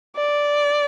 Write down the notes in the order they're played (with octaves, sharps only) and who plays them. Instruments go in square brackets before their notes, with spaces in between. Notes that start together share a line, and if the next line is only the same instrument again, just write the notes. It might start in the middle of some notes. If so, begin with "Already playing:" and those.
[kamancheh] D5